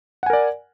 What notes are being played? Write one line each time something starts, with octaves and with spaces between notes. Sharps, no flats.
A#4 D5 F#5 G#5